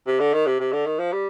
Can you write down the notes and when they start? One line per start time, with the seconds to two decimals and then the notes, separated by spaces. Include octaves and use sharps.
0.07 C3
0.20 D3
0.34 D#3
0.46 C3
0.60 C3
0.73 D3
0.86 D#3
0.99 F3
1.12 G3